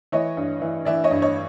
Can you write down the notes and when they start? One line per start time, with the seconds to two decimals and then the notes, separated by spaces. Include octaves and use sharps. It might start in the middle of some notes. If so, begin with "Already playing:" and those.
0.12 E3 C#5 D#5
0.37 G2
0.62 E3
0.85 E3 D5 E5
1.04 C#5 D#5
1.11 G2
1.22 C#5 D#5